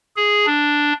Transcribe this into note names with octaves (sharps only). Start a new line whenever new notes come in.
G#4
D4